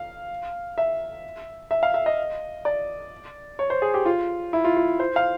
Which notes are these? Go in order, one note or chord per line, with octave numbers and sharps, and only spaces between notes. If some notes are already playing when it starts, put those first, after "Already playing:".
Already playing: F5
E5
E5
F5
E5
D#5
D5
C#5
C5
G#4
G4
F4
E4
F4
F4
C5
F5